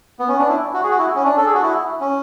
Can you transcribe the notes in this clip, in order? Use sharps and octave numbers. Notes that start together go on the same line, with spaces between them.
B3
C#4
D4
E4
F#4
G#4
F#4
E4
C#4
D4
A4
G#4
F#4
E4
C#4